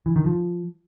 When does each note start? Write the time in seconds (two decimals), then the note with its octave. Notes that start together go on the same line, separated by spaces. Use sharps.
0.06 E3
0.16 D#3
0.26 F3